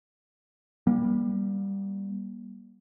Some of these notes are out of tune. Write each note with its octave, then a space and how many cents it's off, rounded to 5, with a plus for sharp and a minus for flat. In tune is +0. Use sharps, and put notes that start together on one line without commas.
G3 +5 A#3 +40